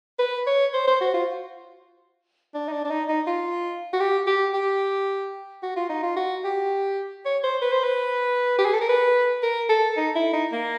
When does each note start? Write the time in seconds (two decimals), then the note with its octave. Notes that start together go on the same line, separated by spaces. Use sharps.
0.19 B4
0.46 C#5
0.74 C5
0.87 C5
1.01 F#4
1.14 F4
2.54 D4
2.68 D#4
2.73 D4
2.85 D4
2.91 D#4
3.09 D#4
3.27 F4
3.93 F#4
4.00 G4
4.27 G4
4.54 G4
5.63 F#4
5.76 F4
5.89 D#4
6.03 F4
6.16 F#4
6.44 G4
7.25 C#5
7.44 C5
7.62 B4
7.73 C5
7.84 B4
8.58 G4
8.65 G#4
8.73 A4
8.81 A#4
8.89 B4
9.43 A#4
9.70 A4
9.97 D#4
10.15 E4
10.33 D#4
10.52 A#3